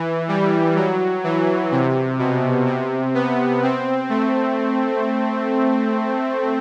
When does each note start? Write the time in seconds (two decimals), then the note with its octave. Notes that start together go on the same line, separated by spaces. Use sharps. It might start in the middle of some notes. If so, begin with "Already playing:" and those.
Already playing: E3
0.28 G3
0.76 F#3
1.24 E3
1.71 C3
2.19 B2
2.66 C3
3.14 B3
3.63 C4
4.09 A3